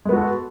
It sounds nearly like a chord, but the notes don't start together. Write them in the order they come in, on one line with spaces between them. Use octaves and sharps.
G#3 B3 F#4 A4